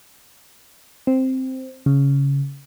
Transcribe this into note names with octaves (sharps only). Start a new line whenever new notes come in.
C4
C#3